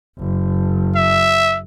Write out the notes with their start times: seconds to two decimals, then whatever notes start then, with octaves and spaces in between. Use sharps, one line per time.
0.18 F#1
0.96 E5